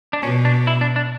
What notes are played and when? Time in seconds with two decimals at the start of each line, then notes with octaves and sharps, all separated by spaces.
0.13 D4
0.23 B2 C#4
0.45 D4
0.67 E4
0.81 D4
0.96 D4